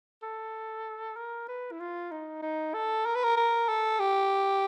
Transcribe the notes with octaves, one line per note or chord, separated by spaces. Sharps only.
A4
A#4
B4
E4
F4
D#4
D#4
A4
A#4
B4
A#4
A#4
A4
G4